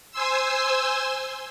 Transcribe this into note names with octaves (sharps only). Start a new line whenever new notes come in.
C5 G#5 C6 E6